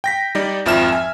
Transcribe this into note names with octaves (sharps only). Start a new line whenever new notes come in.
G5 A#6 B6
G3 D#4 D5
G#1 F2 F3 E5 F6 E7
E5 G#5